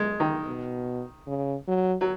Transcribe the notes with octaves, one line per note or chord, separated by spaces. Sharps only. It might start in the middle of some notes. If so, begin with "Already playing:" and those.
Already playing: G#3
D#3
B2
C#3
F#3
F#3